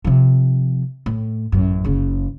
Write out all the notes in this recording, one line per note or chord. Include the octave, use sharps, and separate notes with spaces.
C3 F3
A2
A1 F#2
F#1 C#3